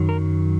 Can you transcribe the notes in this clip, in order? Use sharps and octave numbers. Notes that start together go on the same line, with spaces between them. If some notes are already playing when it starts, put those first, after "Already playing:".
Already playing: F#2 D#3 F#3
A#4